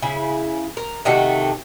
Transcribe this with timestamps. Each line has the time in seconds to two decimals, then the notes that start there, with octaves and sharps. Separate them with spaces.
0.02 C#3 E4
0.77 A#4
1.05 C3 D#3 A3 F#4